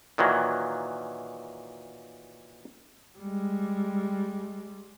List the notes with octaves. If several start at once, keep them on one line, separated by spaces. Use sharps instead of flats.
A#2 D#3 E3 F#3
G3 G#3